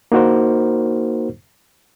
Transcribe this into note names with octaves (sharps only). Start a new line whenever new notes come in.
A#3 D#4 F#4 A#4 C5